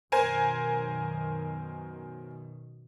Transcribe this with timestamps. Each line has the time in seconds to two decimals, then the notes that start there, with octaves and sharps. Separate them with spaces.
0.12 F#2 B2 D#3 A#4 C5 G#5